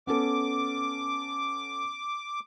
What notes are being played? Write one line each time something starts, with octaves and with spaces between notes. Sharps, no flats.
B3 C#4 A4 D6